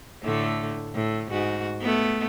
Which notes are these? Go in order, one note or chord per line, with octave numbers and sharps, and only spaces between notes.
A2 D3 A3
A2
G#2 F#4
A3 B3